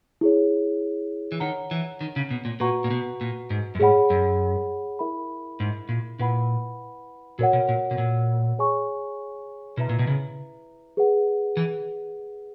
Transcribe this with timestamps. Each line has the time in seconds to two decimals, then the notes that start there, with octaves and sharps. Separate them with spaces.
0.21 E4 G#4 C#5
1.32 E3
1.40 D#3 C#5 F#5 A#5
1.71 E3
2.01 D#3
2.16 C#3
2.31 B2
2.45 A#2
2.60 A#2 F#4 B4 F#5 A#5 C#6
2.84 A#2
2.91 B2
3.21 A#2
3.50 G#2
3.75 F#2
3.80 G#2 G#4 C#5 F#5 B5
4.10 F#2
4.99 E4 A#4 E5 B5
5.60 G#2
5.89 A#2
6.19 A#2 E4 B4 F#5 B5
7.39 A#2 F#4 A#4 C#5 F#5
7.53 B2
7.69 A#2
7.91 B2
7.98 A#2
8.59 G#4 C#5 G#5 C#6
9.77 B2 E4 B4 E5 A#5
9.89 A#2
9.99 B2
10.07 C#3
10.97 G#4 B4 F#5
11.57 E3